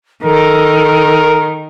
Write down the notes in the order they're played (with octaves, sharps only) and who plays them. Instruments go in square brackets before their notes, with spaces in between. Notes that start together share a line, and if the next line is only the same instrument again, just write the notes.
[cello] D#3 [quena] A4 [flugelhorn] A#4